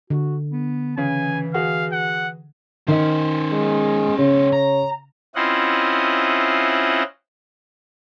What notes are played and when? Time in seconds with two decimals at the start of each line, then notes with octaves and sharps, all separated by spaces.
0.10 D3 F#4
0.53 B3
0.98 C#3 E3 G#5
1.54 F#4 G#4 F5
1.92 F#5
2.88 D#3 C#4 C5 D#5
3.52 G#3
4.18 C#3 C#5
4.52 A#5
5.35 C4 C#4 E4 F4 D#5 F#5